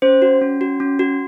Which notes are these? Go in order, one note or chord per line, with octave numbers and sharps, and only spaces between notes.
C#4 C5
F#4
C#4
F#4
C#4
F#4